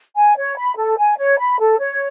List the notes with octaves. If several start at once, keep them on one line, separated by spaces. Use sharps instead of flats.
G#5
C#5
B5
A4
G#5
C#5
B5
A4
C#5